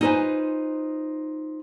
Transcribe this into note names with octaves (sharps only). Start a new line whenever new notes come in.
D#4 F4 A4 B4 C5 G#5